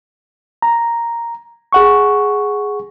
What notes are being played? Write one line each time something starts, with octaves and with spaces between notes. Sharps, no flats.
A#5
G#4 F#5 C#6